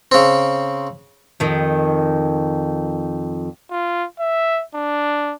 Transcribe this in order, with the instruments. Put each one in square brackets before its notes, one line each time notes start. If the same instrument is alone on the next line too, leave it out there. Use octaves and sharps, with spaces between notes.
[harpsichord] C#3 C4
[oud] F2 D#3
[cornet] F4
E5
D4